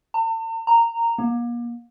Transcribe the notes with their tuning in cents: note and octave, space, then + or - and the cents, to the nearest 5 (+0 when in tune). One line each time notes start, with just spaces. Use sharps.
A5 +45
A#5 -15
A#3 +35